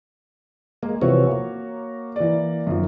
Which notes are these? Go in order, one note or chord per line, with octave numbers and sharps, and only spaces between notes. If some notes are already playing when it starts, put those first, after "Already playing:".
G#3 A#3
C3 E3 F3 F#4 C#5
A#3
E3 D5
F#2 D#3 F3